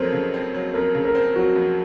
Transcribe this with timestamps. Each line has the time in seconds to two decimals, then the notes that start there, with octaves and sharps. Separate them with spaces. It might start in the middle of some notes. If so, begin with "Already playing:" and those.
Already playing: F2 F#3 C4 A4 A#4 C5
0.12 C#3
0.34 C4
0.54 F#3
0.74 F2 A#4
0.95 C#3
1.05 A#4
1.15 C4
1.36 F#3 F#4
1.55 F2